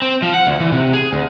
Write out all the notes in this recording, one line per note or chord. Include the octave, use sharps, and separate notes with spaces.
C4
F3
F#5
D2
E3
C3
G#4
D2